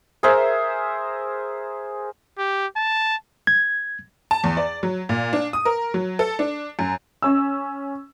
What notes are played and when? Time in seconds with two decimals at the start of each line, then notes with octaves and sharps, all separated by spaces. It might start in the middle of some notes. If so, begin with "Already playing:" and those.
0.23 G#4 A#4 C5 E5
2.38 G4
2.77 A5
3.47 G#6
4.31 A5
4.44 E2
4.57 D5
4.83 F#3
5.09 A#2
5.33 D4
5.53 D#6
5.65 A#4
5.94 F#3
6.19 A4
6.39 D4
6.79 F#2
7.22 C#4 E6